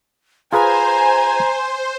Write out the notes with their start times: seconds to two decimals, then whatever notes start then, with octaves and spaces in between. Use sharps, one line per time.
0.53 F4 G#4 B4 C5 G#5 A#5